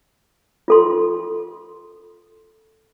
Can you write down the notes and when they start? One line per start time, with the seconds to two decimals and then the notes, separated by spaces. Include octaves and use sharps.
0.68 F4 A4 C6